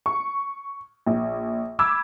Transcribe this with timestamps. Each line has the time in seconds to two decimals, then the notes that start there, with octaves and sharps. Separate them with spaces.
0.06 C#6
1.06 A#1
1.79 B5 D6 E6 G#6